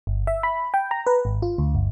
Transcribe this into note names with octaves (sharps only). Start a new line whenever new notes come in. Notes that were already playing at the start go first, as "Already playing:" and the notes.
G1
E5
B5
G5
A#5
B4
G#1
F4
D2
G1